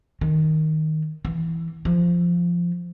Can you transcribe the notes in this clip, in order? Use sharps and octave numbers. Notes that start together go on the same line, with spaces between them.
D#3
E3
F3